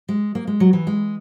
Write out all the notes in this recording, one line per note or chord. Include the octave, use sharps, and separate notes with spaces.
G#3
A#3
G#3
F#3
E3
G#3